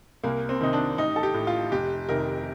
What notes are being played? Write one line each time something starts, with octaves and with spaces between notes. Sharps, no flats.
C2 A#3
C4
C3 D#3 D#4
D4
A1 D#4
A4
G4
A2
F4
F1 G4
F2 C3 D#3 A#4